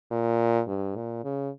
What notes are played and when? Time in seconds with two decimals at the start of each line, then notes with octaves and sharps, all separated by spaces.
0.11 A#2
0.68 G2
0.96 A#2
1.24 C#3